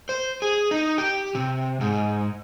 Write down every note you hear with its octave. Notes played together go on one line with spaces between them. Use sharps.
C5
G#4
D#4
G4
C3
G#2